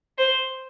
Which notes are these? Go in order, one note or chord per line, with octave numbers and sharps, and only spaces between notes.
C5